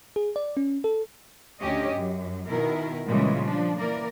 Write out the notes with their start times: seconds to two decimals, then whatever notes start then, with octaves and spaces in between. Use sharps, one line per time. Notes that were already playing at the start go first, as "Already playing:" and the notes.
0.16 G#4
0.36 D5
0.57 C#4
0.84 A4
1.61 D2 C#4 G4 D#5
1.94 F#2
2.47 B2 D#3 E4 A#4
3.08 A#2 C#3 E3 G3 G#3
3.43 F3 D4
3.78 E3 A#3 A#4 D5